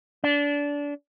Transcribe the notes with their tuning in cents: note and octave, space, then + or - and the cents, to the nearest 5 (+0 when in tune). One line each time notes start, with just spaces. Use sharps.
D4 -25